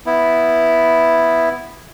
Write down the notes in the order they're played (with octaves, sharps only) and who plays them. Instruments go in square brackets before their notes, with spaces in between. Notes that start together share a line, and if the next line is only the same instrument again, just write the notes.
[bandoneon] B3 E4